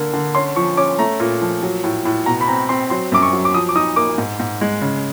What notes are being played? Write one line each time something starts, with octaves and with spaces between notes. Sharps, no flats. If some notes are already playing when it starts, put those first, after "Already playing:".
Already playing: D3 A#3
D3
C#4 C6
F3 C#6
C#4 D6
A3 A#5
A#2
F3
F#3
A2
A2
B2 A#5
B5
C4 A#5
C4 C6
F#3 C6
F#2 D6
C#6
F#3
D6
F3 D#6
D6
D#4 D#6
A#3 D6
G#2
G#2
G#3
C#3